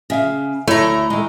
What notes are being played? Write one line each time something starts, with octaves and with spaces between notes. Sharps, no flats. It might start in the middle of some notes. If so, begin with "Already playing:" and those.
C#3 G#4 E5 F5
D2 G#2 A3 E4 C#5 A#5
D#3 G#3